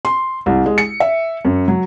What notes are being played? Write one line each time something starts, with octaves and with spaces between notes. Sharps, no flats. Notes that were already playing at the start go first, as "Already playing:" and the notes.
C6
C2
G#3
C#7
E5
F#2
F#3